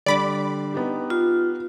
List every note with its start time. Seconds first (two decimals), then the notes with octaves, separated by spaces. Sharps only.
0.06 D3 G3 D5 B5 D6
0.74 B3 D#4 G4
1.10 F4